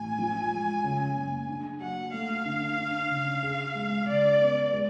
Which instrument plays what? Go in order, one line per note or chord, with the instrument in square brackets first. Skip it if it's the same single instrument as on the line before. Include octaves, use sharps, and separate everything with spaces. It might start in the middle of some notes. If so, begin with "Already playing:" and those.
Already playing: [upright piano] A1 [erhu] G#5
[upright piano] F3
G#3
C#3
F#1
D4
[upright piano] F#3 [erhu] F#5
[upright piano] A3 [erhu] F5
[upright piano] D3
D4
C#3
G#4
G#3
[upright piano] C#3 [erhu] D5
[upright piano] B3
G#3